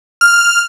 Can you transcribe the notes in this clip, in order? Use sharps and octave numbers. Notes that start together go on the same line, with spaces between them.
F6